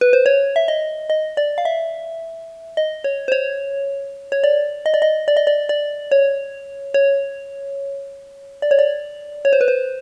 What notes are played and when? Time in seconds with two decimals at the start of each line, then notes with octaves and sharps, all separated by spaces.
0.01 B4
0.13 C5
0.26 C#5
0.56 E5
0.68 D#5
1.10 D#5
1.37 D5
1.58 F5
1.65 E5
2.77 D#5
3.04 C#5
3.28 C5
3.32 C#5
4.32 C#5
4.44 D5
4.86 D#5
4.94 D5
5.02 D#5
5.28 D5
5.37 D#5
5.47 D5
5.69 D5
6.11 C#5
6.94 C#5
8.62 D5
8.71 C#5
8.79 D5
9.45 C#5
9.53 C5
9.61 B4
9.68 C5